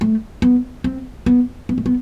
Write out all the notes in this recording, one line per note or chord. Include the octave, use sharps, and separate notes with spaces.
A3
B3
C4
B3
B3
A3
B3